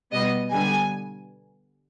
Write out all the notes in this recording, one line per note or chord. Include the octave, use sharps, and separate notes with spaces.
B2 G3 B3 D#5
D3 G3 B3 G#5